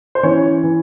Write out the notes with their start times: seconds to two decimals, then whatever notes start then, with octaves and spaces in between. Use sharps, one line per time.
0.15 C5
0.23 E3 C#4 C#5
0.63 E3